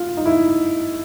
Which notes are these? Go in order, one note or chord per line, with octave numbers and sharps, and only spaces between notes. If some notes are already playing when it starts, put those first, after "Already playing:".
Already playing: F4
D#4
E4